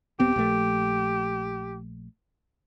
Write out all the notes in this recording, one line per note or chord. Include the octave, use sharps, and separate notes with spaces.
D#1 B3 C4 G4
A#1 A3